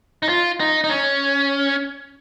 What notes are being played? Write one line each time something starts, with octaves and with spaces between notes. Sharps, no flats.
D#4
F4
D#4
D#4
C#4